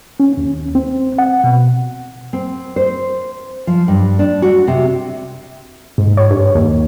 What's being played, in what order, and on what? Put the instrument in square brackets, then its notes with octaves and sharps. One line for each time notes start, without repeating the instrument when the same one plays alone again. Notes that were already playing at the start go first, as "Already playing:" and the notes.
[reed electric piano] C#4
D#2
C4
F#5
B2
[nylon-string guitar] C4
C5
F3
G2
D4
F#4
C3
[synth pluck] G#2
C#5
G2
D#2